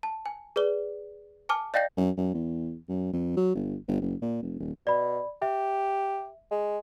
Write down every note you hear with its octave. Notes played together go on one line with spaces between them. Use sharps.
A5
G#5
G#4 B4 D5 G7
G#5 A5 D6 F6
D5 D#5 F5 G5 G6 A#6
F#2
F#2
E2
F#2
F2
F#3
G1
G1
F#1
A#2
F1
D#1
B2 D5 B5
G4 E5
G#3